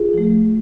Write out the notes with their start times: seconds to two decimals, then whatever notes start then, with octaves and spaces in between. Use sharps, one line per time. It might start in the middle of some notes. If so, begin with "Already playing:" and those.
Already playing: F4 G#4
0.13 F3 A3